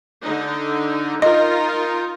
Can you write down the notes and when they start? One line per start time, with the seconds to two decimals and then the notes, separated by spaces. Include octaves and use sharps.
0.22 D3 D#4
1.22 D#4 F4 A#4 D#5